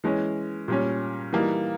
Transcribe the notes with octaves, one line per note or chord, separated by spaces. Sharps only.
E3 G#3 C#4
A#2 G3 C#4
E3 G3 A#3 D#4